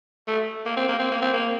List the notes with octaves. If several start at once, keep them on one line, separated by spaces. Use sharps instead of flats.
A3
A#3
C4
A#3
C4
A#3
C4
A#3